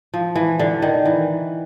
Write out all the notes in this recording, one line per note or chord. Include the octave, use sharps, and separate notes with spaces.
F3
E3
D3
D#3
E3